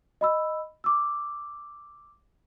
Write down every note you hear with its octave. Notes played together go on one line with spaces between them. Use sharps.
D#5 B5 E6
D6 E6